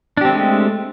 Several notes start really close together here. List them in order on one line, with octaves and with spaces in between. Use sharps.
D4 G4 C4 A3 G#3